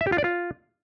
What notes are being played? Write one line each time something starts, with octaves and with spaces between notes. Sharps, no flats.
E5
G4
F4
D5
F4